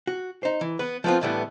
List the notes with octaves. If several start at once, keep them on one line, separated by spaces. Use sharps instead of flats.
F#4
D#4 C5
E3
B3 B4
F3 A3 B3 C4 F4
A2 D3 E3 G3 A3 B3